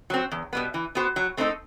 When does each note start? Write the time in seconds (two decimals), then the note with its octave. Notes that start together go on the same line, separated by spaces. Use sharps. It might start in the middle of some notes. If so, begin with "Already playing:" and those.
0.10 F#3 C4
0.31 E2
0.53 B2 G3 B3
0.74 E3
0.95 B3 F#4 C5
1.16 F#3
1.37 A3 C4 D#4 A4